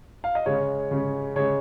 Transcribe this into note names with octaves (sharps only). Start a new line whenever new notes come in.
F5
D#5
C#3 G#3 C#5
C#3 G#3
C#3 G#3 C#5